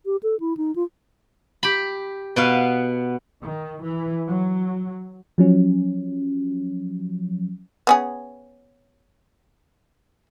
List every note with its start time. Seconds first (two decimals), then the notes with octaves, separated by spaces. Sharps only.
0.06 G4
0.23 A4
0.40 E4
0.57 D#4
0.76 F4
1.63 G4 B5
2.36 B2 B3 F5
3.42 D#3
3.83 E3
4.26 F#3
5.38 F3 F#3 C#4
7.87 B3 C#4 G#4